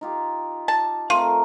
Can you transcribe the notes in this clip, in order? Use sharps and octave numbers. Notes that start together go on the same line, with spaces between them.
D#4 F4 G4
A5
A3 C4 F4 A#4